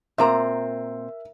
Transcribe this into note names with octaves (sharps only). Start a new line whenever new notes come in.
A#2 C4 A#4 E5 A#5